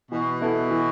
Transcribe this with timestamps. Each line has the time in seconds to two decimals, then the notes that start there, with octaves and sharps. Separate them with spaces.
0.11 B2 E3
0.41 B3 E4 A4
0.71 E3